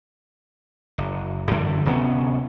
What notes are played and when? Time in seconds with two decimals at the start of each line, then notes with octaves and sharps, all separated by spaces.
0.98 F#1
1.51 F#2 D3 E3 G3
1.85 D1 C3 B3 C#4